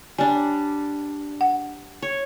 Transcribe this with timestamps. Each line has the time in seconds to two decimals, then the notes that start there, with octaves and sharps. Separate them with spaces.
0.18 G3 D4 G#5
1.41 F#5
2.02 C#5